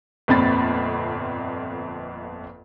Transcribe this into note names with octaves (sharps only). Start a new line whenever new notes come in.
G1 F2 A#2 C4 B5 A6